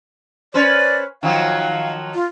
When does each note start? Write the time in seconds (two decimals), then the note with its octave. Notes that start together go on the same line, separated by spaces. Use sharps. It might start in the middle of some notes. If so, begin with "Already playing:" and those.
0.54 C#4 B4 C5 D5
1.23 D#3 F3 F#3 F5
2.15 F4